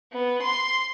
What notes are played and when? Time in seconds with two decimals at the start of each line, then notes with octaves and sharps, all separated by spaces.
0.13 B3
0.43 C6